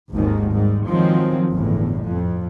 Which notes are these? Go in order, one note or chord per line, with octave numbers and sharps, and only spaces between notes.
G#1 D#2 G#2 D#3 F3
G#2 G3
D#3 F3 F#3 G#3 C4
G1 E2 A2
F2